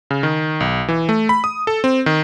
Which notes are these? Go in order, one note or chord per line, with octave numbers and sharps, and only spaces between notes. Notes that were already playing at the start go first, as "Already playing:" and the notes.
C#3
D#3
B1
E3
A3
B5
D#6
A4
C4
D#3